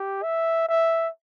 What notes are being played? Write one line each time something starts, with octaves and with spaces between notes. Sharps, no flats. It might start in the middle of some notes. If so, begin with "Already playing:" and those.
Already playing: G4
E5
E5